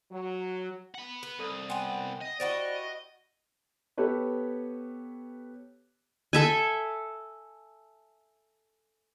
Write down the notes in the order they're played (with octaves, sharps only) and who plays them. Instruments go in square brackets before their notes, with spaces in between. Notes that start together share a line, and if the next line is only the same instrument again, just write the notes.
[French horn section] F#3
[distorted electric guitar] F#5 B5
[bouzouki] B4
[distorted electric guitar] C2 [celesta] A4 D#6 D#7
[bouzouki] B3 B4 [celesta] G5 G#5 C6
[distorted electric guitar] D#5
[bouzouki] E4 F#4 G4 [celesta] C5 B5 [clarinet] D5
[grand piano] B3 G4 A4 B4 C#5
[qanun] A4 E5 G#5